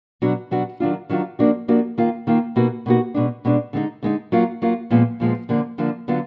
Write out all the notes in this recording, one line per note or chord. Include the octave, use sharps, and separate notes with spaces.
B2 F#3 D4 F#4
B2 F#3 D4 F#4
D#3 F#3 D4 F4
D#3 F#3 D4 F4
F3 A#3 D4 F#4
F3 A#3 D4 F#4
D#3 A#3 F4
D#3 A#3 F4
B2 A#3 D#4 F#4
B2 A#3 D#4 F#4
B2 G#3 D4
B2 G#3 D4
D3 G#3 B3 D#4
D3 G#3 B3 D#4
F#3 A#3 F4
F#3 A#3 F4
A#2 F3 G#3 B3
A#2 F3 G#3 B3
D3 F3 A#3 D4
D3 F3 A#3 D4
D3 F#3 B3 F4